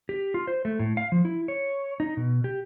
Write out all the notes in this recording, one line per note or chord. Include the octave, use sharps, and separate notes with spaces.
G4
F4
C5
A3
A2
F5
F3
E4
C#5
D#4
B2
G4